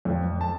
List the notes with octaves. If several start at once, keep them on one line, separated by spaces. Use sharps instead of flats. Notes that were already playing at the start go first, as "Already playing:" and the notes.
F2
A5